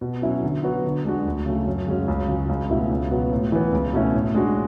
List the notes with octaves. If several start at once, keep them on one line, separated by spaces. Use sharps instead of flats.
B2
F#3 C#4 E4
D3
F#3 B3 F#4
D3
G#3 D4 F#4
D2
C#3 F#3 A3
F#2
C#3 G#3 C#4 F#4
C#2
C#3 F#3
C#2
B2 A3 E4
C#2
B2 F#3 B3
A2
E3 B3
C#2
B2 A3 C#4 E4
A2
G#3 D4 F#4